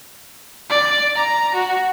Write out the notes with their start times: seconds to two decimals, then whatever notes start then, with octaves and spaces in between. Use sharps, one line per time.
0.70 D5
1.16 A#5
1.54 F#4